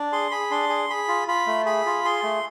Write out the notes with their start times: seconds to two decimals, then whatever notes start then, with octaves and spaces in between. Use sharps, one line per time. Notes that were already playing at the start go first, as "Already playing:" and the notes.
Already playing: D4
0.12 G#4 C6
0.31 G#4 B5
0.51 D4 C6
0.69 G#4
0.90 G#4 B5
1.08 F4
1.28 F4 B5
1.47 A3
1.66 G#4 B5
1.86 F4
2.05 G#4 C6
2.23 A3